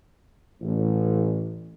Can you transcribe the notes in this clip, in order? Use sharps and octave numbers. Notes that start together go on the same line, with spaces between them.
A1